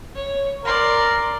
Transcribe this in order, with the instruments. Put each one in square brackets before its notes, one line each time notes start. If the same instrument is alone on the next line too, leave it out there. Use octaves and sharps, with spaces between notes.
[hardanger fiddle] C#5
[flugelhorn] A#4 [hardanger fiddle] D5 C6